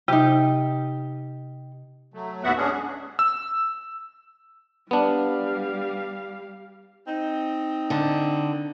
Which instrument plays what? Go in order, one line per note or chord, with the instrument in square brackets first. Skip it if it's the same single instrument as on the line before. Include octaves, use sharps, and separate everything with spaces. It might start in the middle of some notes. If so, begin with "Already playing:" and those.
[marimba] C3 [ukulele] D#4 G4
[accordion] F#3 A3
D#2 A2 B3 F#4 E5 F#5
G#3 C#4 D4 G#4
[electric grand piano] E6
[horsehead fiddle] G3 F5 [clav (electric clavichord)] B3 D4
[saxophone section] C4 D#4
[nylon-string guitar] D3